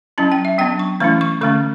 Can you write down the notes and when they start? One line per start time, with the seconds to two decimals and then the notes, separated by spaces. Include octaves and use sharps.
0.18 F#3 C#4 E4 A5
0.32 G5
0.45 E5
0.58 F#3 B3 D4 G5
0.79 C#6
1.00 E3 A3 C#4 E4 C#6
1.21 C#6
1.41 D3 A3 C#4 C#6